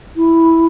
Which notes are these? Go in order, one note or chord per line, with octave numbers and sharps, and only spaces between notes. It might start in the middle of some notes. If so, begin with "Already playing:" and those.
E4